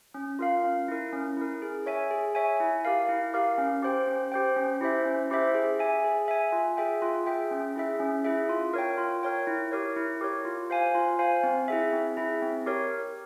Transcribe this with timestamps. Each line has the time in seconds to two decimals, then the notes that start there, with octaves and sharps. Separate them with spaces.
0.14 C#4
0.39 F4 A#4 F5
0.64 C#4
0.88 E4 A#4
1.13 C#4
1.37 E4 A#4
1.62 G#4
1.86 C#5 E5 G#5
2.11 G#4
2.35 C#5 E5 G#5
2.60 E4
2.85 G4 A#4 F5
3.09 E4
3.34 G4 A#4 F5
3.58 C#4
3.82 G4 C5 G5
4.07 C#4
4.32 G4 C5 G5
4.56 C#4
4.81 E4 G4 C5 E5
5.05 C#4
5.30 E4 G4 C5 E5
5.54 G#4
5.79 E5 G#5
6.04 G#4
6.28 E5 G#5
6.52 F4
6.77 G#4 E5 G5
7.02 F4
7.26 G#4 E5 G5
7.51 C#4
7.76 E4 G#4 E5
8.00 C#4
8.24 E4 G#4 E5
8.49 F4
8.74 A#4 C#5 G5
8.98 F4
9.23 A#4 C#5 G5
9.47 E4
9.72 G4 A#4 C#5
9.96 E4
10.21 G4 A#4 C#5
10.45 F4
10.70 C5 F5 G#5
10.95 F4
11.19 C5 F5 G#5
11.43 C4
11.68 E4 G#4 E5
11.93 C4
12.17 E4 G#4 E5
12.42 C4
12.66 G4 A#4 C#5